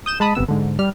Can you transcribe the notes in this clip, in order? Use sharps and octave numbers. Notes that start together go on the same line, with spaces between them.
D#6 G6 E7
G#3 A5 B5 D#6
G1 C3 B3 E6
G#2 D3
G3 F6